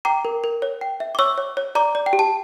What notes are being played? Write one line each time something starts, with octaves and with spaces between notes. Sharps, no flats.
G5 A#5 D6
A#4
A#4
C#5
G5
E5
D6
C#5 C#6 E6
C#5
C#5
D5 A#5 D6
D5
G5
G4
A5